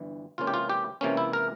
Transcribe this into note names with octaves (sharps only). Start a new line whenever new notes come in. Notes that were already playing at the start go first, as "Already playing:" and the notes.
Already playing: G1 G2 E3
C#2 C3 E3 A#3 C#4 F4
G4
F4
G4
C#2 C3 E3 A#3 C#4
E4
A#4